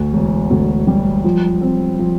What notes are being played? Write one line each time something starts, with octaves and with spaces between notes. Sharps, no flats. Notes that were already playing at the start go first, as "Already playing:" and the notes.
Already playing: D2
E1
D2
G3
F3
C4
F3